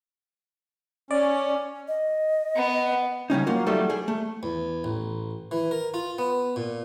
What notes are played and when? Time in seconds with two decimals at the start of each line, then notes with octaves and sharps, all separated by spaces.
1.11 C#4 D5
1.88 D#5
2.56 B3
3.30 C#3 G3 C#4 D#4
3.47 F#3 A#3 F4
3.66 F#3 G3 A3 D#4 A4 E5
3.90 G#4
4.08 A3
4.43 E2
4.84 A1
5.51 E3
5.71 A#4
5.94 F4
6.18 B3
6.56 A#2